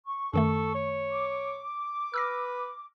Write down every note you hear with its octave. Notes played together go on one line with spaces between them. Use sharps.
C#6
F#2 D#3 A3 A4
C#5
D6
B4 E6 F6 A#6